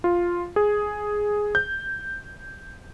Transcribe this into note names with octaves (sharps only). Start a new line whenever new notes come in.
F4
G#4
G6